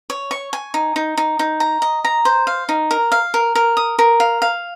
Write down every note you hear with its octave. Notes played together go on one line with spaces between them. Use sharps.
C#5
C#6
G#5
D#4
D#4
D#4
D#4
A#5
D#5
A#5
C5
F5
D#4
A#4
F5
A#4
A#4
D#6
A#4
F5
F5